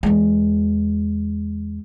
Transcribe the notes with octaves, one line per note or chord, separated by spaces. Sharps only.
E2 G#3